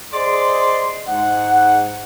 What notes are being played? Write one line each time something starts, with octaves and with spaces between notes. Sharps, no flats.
G#4 C5 D5 D#5 C6
G#2 F#5